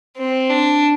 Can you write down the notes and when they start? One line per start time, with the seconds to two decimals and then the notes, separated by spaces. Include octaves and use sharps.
0.17 C4
0.50 D4